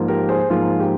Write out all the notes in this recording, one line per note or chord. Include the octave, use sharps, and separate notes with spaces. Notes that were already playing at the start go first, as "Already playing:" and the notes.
Already playing: G#2 F3 A#3
G4 A#4
G#4 C5
G#2 F3 A#3 F4 G#4
G4